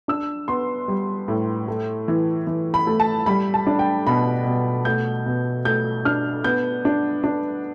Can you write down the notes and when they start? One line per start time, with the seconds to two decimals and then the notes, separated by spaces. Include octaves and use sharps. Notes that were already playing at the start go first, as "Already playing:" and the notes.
0.08 D4 E6
0.48 B3 C6
0.88 G3
1.28 A2
1.68 A3
2.08 E3
2.47 E3
2.74 B5
2.87 A3
3.00 A5
3.26 G3 B5
3.54 A5
3.67 D4
3.79 G5
4.07 B2 B5
4.46 B2
4.85 A3 G6
5.26 B2
5.65 A3 G6
6.05 D4 F6
6.44 B3 G6
6.85 D4
7.24 D4